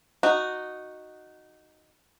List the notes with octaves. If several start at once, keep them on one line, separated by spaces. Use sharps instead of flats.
D#4 F#4